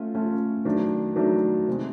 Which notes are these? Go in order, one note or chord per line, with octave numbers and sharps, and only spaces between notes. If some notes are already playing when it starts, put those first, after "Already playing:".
Already playing: A3 C#4 F4
A3 C#4 F4
D#3 F#3 A3 D4
D#3 F#3 A3 D4
C3 D#3 G#3